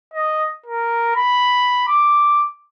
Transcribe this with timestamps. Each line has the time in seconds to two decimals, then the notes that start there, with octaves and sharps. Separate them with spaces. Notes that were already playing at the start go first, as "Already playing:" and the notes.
0.14 D#5
0.66 A#4
1.16 B5
1.88 D6